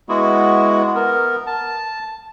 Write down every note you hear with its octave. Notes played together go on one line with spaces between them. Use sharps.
G#3 B3 E4 F#4
B3 A#4
A5